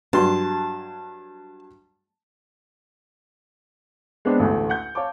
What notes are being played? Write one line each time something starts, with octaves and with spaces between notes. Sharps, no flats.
G2 F#3 A5 C6
G#3 B3 C4 D4
A1 D2 A3
F#5 G6
C#5 F5 A5 C#6 D6